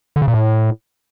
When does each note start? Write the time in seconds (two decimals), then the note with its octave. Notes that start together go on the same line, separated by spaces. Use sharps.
0.16 D3
0.22 C#3
0.28 A#2
0.34 A2